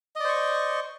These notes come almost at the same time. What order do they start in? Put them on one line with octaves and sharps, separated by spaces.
D#5 D5 C5 C#6